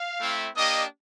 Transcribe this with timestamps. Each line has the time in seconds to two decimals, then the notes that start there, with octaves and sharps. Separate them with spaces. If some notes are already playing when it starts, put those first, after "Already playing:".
Already playing: F5
0.19 A3 C4 E4
0.56 A#3 D4 G4 D#5